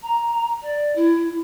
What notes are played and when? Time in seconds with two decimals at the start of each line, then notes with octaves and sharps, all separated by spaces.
0.02 A#5
0.62 D5
0.95 E4